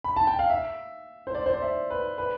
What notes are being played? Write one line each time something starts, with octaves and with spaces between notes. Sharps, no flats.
B5
A5
G5
F5
E5
C5
D5
C5
D5
E5
B4
B4